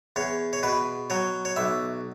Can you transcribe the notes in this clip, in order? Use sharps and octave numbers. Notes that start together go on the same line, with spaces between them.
E2 C#5
C#5
B2 B4
F#3 C#5
C#5
B1 E5